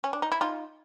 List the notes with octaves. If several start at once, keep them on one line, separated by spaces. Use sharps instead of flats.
C#4
D4
D#4
E4
D#4 F4